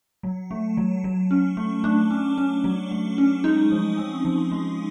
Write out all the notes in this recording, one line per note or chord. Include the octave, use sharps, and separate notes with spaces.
F#3
A3
F#3
F#3
C#4
A3
A3 D4
C#4
C#4
F#3
A3
C#4
G#3 D#4
F3
C4
F3
G#3